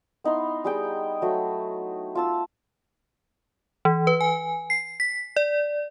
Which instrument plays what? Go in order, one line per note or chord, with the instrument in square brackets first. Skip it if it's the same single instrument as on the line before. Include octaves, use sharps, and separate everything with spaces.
[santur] B3 D#4 E4 C6
G3 G#4 G5
F#3 A3
F4 A5 E6
[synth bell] E3
B4
G#5
C7
B6
D5